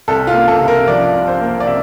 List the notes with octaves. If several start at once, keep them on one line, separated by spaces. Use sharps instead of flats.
C2 A4
F4
A#3
A4
C3
A#4
F3 D5
C2
C5
A#3
D5
C3 E5